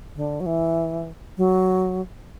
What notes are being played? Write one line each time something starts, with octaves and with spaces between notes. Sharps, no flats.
D3
F#3
E3
F#3